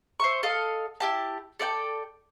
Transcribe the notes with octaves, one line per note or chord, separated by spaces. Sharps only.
C5 E5 C#6
A4 D#5 F5
E4 G4 A5
A4 D5 F#5 G5